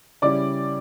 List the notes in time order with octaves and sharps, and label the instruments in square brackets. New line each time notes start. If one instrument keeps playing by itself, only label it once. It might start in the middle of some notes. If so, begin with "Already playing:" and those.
[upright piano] C#3 G3 C#4 E4 D5 D6